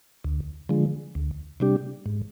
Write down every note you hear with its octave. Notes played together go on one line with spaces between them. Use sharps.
D2
D3 F3 G#3
D2
C3 G3 D4 G4
G#2